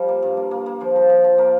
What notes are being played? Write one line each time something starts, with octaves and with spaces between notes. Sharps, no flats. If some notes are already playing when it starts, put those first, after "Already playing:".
Already playing: F3 G3 D5 F5
A#3
G2
A#3
A#3
A#3
F3 C5
F3
F3
F3
A#3 A#4